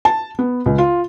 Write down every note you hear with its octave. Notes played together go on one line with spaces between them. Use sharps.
A5
B3
C#2
F4